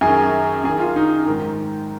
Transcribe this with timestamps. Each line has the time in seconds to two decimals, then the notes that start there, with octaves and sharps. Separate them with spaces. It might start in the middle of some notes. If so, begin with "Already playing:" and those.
0.01 F#2 D#3 G#4
0.64 F#2 G#4
0.69 D#3
0.80 F4
0.96 D#4
1.26 G#2 D#3